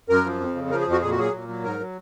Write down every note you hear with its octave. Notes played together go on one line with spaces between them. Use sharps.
F#2 A#4
F3
F2
C#3
F3 A#4
G#4
F2
F#4
A#2 G#4
F#4
F#3 G#4
A#2
F#3
G#2 A#4
F#3